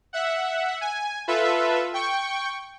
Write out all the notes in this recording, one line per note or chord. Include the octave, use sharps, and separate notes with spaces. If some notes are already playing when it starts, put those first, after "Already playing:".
E5 F#5
G#5
F4 A4 B4 E5
G5 C#6